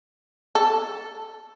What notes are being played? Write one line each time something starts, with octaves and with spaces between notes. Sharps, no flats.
A4